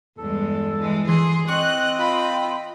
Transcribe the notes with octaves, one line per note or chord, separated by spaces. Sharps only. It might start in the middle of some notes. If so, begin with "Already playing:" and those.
E2 G2 G#3 A4
E3 G#3
E3 G#4 C6
C4 D#5 C#6 F#6
F4 B5